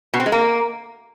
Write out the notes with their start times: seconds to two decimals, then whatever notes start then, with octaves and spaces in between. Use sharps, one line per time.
0.14 B2
0.20 C4
0.26 G#3
0.32 A#3